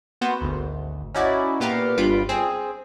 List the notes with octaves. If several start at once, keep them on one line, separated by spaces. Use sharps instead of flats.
A#3 B3 F#4 B4 C5
G#1 D2
C#4 D#4 E4 F#4 D5
A#2 B3 G4 F5 A#5
G1 G2 G3 F4 B5 D7
C4 G#4